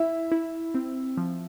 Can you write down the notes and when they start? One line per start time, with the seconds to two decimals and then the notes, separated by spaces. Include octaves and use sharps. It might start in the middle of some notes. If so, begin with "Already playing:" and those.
Already playing: E4 E5
0.32 E4
0.74 C4
1.17 F3